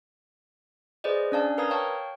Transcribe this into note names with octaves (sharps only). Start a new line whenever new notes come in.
G#4 B4 C5 D5 D#5
C#4 D4 D5 F5 A5
A#4 B4 F5 A#5 D#6 G#6
C#5 F5 G5 A5 C#6